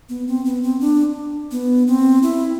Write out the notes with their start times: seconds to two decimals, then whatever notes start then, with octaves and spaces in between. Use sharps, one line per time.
0.09 B3
0.27 C4
0.45 B3
0.63 C4
0.80 D4
1.51 B3
1.87 C4
2.23 E4